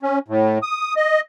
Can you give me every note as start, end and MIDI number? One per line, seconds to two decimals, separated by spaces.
0.03 0.19 61
0.28 0.58 45
0.63 0.94 87
0.96 1.21 75